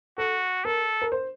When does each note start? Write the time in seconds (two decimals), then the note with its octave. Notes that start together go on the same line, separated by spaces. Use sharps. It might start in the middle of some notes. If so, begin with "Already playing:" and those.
0.18 F#4 A4
0.65 A4 A#4
1.02 A#4
1.12 C5